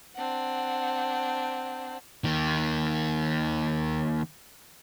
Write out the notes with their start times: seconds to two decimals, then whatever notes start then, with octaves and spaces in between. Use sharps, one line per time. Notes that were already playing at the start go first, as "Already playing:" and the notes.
0.15 C4 D4 F#5
2.24 D#3 A#3